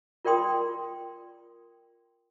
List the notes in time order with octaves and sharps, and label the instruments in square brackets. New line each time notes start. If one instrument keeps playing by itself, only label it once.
[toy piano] F4 A#4 D5 G5 C6 D#6